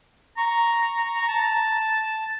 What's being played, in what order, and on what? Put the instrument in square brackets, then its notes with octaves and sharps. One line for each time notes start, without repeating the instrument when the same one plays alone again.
[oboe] A#5 [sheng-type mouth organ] C#6
[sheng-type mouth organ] A5